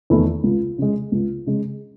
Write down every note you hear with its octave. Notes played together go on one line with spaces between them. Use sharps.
E2 D#3 A3 E4
C#2
C#3 G#3
C#2
C#3 G#3